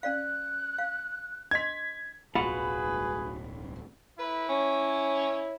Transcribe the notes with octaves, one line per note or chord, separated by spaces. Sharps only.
C#4 D5 F5 F#6
F5
D4 D#5 C6 G#6 B6
D1 B1 D3 F4 F#4 G#4 B4 B5
E4 B4
C#4 C#5